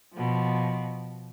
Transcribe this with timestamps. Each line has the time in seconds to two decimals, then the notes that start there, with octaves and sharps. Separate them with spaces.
0.14 B2 F3